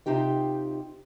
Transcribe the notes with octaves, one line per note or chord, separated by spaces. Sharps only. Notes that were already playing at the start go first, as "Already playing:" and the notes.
C3 D#4 F4 G4 G5